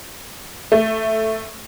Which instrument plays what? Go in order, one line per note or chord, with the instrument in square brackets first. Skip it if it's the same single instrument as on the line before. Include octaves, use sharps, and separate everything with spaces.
[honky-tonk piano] A3